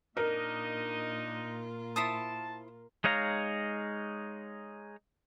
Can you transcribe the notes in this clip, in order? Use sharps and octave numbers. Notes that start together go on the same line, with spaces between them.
A#2 D4 D#4 F4 A#4 D#5
E4 C5 A5 D#6
G#3 D#4 C#5 F5 A#5